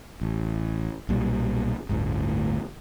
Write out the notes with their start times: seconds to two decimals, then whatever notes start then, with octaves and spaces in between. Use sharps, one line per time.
0.21 A1
1.09 B1 A#2 G3
1.89 G1 D2 A2